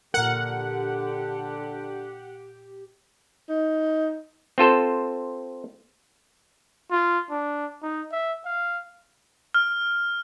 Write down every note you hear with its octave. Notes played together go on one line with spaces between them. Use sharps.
A#2 D3 G4 A#4 F#5
D#4
C4 F4 A4 C5
F4
D4
D#4
E5
F5
F6